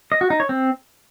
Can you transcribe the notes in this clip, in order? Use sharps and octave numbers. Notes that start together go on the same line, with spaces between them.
D#5
F#4
D#4
C#5
C4